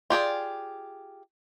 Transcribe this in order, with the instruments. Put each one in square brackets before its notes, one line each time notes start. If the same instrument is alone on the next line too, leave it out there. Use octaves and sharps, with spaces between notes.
[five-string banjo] F4 G4 G#4 D5